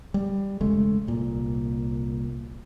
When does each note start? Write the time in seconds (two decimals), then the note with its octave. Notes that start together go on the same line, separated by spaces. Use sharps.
0.14 G3
0.61 E1 C#3 G#3 A3
1.07 C2 A#2